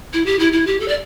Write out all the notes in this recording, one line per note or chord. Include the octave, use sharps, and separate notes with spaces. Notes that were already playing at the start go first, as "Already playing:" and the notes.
E4
G4
E4
E4
G4
A4
D5